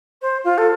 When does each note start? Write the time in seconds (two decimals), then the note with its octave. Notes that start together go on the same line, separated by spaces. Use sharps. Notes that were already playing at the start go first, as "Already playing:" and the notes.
0.22 C5
0.44 F4
0.58 A4